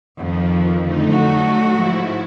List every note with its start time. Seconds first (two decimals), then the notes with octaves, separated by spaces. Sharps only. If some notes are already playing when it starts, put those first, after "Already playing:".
0.18 F2 D#3 F3
0.82 D3 A3 D#4
1.11 F#3 F#4
1.71 G#2 F3 E4